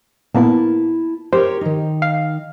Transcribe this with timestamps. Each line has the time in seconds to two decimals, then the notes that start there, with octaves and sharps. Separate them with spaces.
0.34 A#2 A#3 B3 E4 A5
1.33 G4 A#4 C5 C#5
1.61 D#3 D#4
2.02 F5